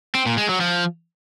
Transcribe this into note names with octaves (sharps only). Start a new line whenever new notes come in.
C4
A#2
G#3
F#3
F3